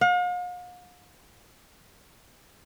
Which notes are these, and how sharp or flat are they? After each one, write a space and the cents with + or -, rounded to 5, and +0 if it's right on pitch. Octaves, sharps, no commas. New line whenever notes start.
F5 +45